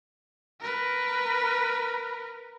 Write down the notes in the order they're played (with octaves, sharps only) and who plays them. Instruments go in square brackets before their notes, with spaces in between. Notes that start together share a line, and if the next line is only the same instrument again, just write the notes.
[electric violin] A#4 B4